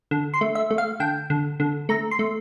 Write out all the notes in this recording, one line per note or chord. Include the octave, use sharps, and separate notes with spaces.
D3
C6
A3
E5
A3
F5
D3 G5
D3
D3
A3 A#5
C6
A3